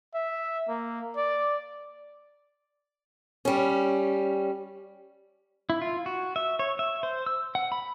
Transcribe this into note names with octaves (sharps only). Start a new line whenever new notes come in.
E5
A#3
D5
G3 C#4
E4
F4
F#4
E5
C#5
E5
C5
E6
F#5
B5